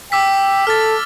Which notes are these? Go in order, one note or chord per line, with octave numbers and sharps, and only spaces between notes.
G5 D6 E6 B6
A4 F6 A6